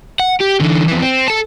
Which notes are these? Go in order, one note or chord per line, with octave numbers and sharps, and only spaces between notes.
F#5
G4
D3 E3
F2 E3
C4
A4 A5